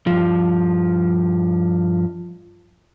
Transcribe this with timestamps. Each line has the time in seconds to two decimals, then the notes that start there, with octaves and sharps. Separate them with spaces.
0.07 G2 F3